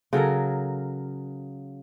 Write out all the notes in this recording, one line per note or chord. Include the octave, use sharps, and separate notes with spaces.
C#3 F#3 A4 A#4